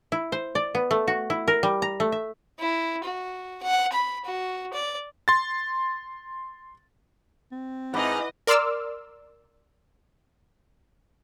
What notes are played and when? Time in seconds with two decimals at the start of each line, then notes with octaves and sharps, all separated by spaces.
0.12 E4
0.32 C5
0.55 D5
0.75 B3
0.91 A3
1.08 F#4
1.30 E4
1.48 A#4
1.63 G3
1.82 A#5
2.00 A3
2.12 E5
2.59 E4
3.05 F#4
3.63 F#5
3.92 B5
4.25 F#4
4.73 D5
5.28 C6 A6
7.52 C4
7.94 G#2 D#4 E4 B4 D#5 F#5 B5 D6
8.47 A#4 D5 C6 D6 E6 F6